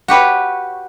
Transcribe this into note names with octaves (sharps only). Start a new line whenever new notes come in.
F#4 G4 B4 C#5